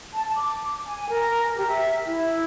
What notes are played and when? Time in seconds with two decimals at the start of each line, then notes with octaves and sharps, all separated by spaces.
0.14 A5
0.36 D6
0.86 G#5
1.09 A#4
1.55 G4
1.67 E5
2.07 E4